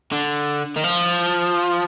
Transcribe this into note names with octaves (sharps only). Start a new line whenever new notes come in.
D3
D#3
F3